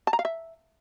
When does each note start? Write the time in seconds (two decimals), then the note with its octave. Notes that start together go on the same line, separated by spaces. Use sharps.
0.07 A5
0.13 A#5
0.19 F5
0.25 E5